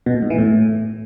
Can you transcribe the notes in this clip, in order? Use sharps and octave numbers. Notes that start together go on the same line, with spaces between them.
B2
A#2
G#2
E3
A2